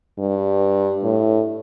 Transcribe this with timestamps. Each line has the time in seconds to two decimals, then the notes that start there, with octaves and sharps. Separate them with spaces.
0.18 G2
1.03 A2